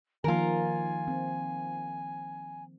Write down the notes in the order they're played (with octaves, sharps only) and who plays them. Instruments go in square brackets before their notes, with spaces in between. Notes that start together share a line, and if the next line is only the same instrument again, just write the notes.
[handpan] D#3 F3 A#3 [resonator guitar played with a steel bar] F4 A#4 [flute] G#5
[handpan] C4